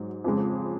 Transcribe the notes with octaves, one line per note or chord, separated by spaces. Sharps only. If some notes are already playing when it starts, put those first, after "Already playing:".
Already playing: G#2 F#3
F2 C#3 G#3